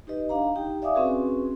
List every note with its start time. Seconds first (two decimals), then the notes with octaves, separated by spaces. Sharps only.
0.07 D#4 G4 B4 D#5
0.29 D4 F5 A#5
0.56 D#4 G4 G5
0.82 D5 E5 F5 G#5 D6 D#6
0.95 C4 C#4 F#4 G#4 B4